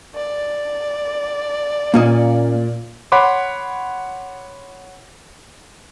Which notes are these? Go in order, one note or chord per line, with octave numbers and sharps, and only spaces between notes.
D5
A#2 A#3 C#4 D#5
C#5 F#5 B5 C6 D6